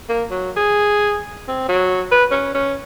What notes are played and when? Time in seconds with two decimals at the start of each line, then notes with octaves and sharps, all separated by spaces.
0.09 A#3
0.30 F#3
0.56 G#4
1.48 C4
1.68 F#3
2.11 B4
2.31 C#4
2.54 C#4